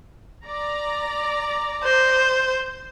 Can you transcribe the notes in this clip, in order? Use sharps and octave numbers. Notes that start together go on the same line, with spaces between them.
D5 A#5
C5